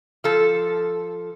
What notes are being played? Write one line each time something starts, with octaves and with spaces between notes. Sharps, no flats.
F3 A4